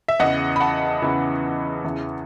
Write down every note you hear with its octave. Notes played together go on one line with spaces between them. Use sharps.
E5
E2 C#3 E3 D#5 F#5
B5
F#5 A5
E2 C#3 E3
E2 C#3 E3